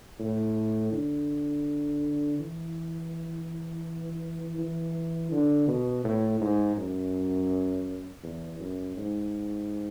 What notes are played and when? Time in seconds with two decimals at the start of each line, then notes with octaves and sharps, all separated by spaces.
0.19 A2
0.92 D3
2.39 E3
4.58 E3
5.31 D3
5.68 B2
6.04 A2
6.41 G#2
6.77 F#2
8.23 E2
8.59 F#2
8.96 G#2